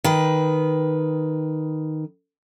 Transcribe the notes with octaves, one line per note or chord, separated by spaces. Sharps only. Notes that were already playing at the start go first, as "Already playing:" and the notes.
D#3 B4